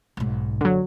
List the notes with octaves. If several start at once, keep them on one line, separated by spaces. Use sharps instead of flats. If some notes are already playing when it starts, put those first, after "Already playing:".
B1 G#2
F#1 D3 F#3